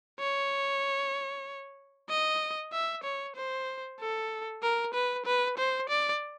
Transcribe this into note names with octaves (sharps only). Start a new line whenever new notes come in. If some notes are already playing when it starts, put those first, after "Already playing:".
C#5
D#5
E5
C#5
C5
A4
A#4
B4
B4
C5
D5